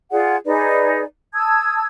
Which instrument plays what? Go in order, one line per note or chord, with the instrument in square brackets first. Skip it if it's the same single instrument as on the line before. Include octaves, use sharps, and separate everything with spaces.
[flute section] F4 G#4 D5 F#5
D#4 G#4 B4 D5
A5 D#6 E6 G#6